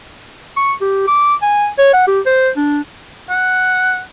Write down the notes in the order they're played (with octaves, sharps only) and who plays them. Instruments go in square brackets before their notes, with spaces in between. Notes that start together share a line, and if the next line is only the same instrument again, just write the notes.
[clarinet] C#6
G4
D6
G#5
C#5
F#5
G4
C5
D4
[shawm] F#5